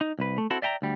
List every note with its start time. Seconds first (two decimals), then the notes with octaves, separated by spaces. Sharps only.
0.01 D#4
0.19 C2 B4
0.38 A3
0.50 C4 E4 F#4 A4
0.62 D5 E5 G5 A5 A#5
0.82 D2 G3